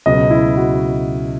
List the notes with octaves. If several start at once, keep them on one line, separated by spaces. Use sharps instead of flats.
C#2 B2 F#3 D#5
E4
F#4